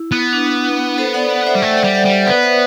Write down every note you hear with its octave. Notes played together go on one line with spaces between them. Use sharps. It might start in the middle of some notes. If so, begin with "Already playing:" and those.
Already playing: E4
B3
D4
A4 C5
D5 F#5
D5 F#5
C5 E5
G3
A3 E5 G5
D5 F#5
G3
D5 F#5
G3
C5 E5
B3 B4 D5
C5 E5